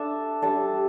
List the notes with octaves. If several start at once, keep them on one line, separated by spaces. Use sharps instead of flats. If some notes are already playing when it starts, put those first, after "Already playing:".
Already playing: D4 A4 E5
G3 D4 A4 E5